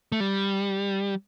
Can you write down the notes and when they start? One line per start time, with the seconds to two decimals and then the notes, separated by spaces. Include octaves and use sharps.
0.12 A3
0.20 G3